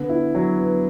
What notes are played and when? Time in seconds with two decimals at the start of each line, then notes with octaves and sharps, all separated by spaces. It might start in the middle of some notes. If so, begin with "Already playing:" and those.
Already playing: D3 B3
0.09 E4
0.35 F#3
0.59 B3